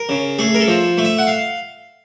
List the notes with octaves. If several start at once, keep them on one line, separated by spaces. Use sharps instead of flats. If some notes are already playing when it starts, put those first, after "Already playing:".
Already playing: A#4
C#3
A3 G#4
A#4
A4
F3
A3
E5
F#5
F5